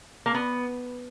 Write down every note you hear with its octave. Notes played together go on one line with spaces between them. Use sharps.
A#3
B3